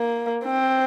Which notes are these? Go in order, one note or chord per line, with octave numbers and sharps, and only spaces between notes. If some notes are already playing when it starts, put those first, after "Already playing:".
Already playing: A#3
C4